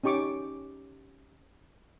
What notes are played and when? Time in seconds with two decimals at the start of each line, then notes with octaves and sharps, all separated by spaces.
0.04 C#4 D#4 G4 C#6 D6